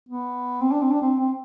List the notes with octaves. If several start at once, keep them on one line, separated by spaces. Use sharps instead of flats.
B3
C4
D4
C4
D4
C4
C4